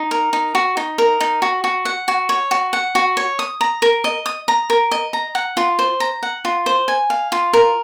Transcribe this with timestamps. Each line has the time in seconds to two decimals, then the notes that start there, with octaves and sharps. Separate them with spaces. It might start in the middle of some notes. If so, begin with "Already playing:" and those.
Already playing: D#4
0.11 A#4
0.33 D#4
0.55 F#4
0.77 D#4
0.98 A#4
1.20 D#4
1.42 F#4
1.64 F#4
1.85 F#5
2.08 F#4
2.29 C#5
2.51 F#4
2.73 F#5
2.95 F#4
3.17 C#5
3.39 D#6
3.61 A#5
3.82 A#4
4.04 D#5
4.26 D#6
4.48 A#5
4.70 A#4
4.91 D#5
5.13 A#5
5.35 F#5
5.57 F4
5.79 C5
6.00 A#5
6.23 F#5
6.45 F4
6.66 C5
6.88 G#5
7.10 F5
7.32 F4
7.53 A#4